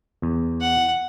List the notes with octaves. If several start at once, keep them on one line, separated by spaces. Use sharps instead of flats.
E2
F#5